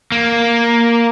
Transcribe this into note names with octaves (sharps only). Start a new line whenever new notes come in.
A#3